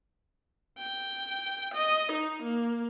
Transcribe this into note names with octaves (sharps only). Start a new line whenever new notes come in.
G5
D#5
D#4
A#3